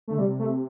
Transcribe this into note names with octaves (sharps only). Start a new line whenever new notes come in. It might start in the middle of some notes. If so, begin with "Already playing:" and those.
D3 A3
C3 G3
A3